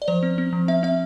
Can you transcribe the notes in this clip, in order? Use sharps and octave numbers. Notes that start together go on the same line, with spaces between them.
D5
F3 C5
C4
C4
F3
C4 E5
C4 E5